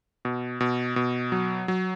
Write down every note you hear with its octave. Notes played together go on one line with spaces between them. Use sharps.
B2
B2
B2
F#3
F#3